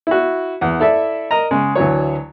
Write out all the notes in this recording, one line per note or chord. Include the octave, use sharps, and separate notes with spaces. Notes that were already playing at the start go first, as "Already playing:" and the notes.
E4 F#4
E2 F#5
E4 A4 D5 E5
A#4 D#5 A#5
C#3 G#3
D2 E3 F#3 C#5